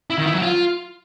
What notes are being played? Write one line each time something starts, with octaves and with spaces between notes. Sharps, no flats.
E4
D#3
E4
F#3
F4